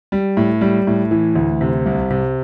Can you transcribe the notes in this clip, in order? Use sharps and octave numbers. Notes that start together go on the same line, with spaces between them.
G3
A2
G3
A2
E3
D2
C3
C2
C3